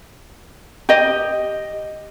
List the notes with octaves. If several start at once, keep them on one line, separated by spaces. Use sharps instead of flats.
G4 D#5